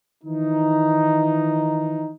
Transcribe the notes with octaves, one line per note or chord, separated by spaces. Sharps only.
D#3 E3 D#4